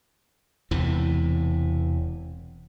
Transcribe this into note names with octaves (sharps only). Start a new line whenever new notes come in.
E1 E2 C3 E3